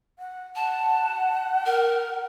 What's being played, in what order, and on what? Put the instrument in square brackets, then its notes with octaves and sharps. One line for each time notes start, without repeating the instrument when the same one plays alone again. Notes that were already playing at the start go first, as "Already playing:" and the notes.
[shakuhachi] F#5
[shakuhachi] F#5 [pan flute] A5
[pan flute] A#4